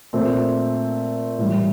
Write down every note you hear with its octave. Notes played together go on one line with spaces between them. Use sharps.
A#2 A3 C4
A2 E3 G3